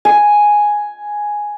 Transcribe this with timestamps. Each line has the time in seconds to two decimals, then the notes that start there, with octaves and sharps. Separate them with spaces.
0.05 G#5